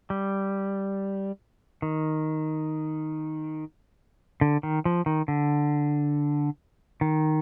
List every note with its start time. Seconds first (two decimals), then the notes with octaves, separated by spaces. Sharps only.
0.10 G3
1.82 D#3
4.41 D3
4.63 D#3
4.85 F3
5.06 D#3
5.28 D3
7.01 D#3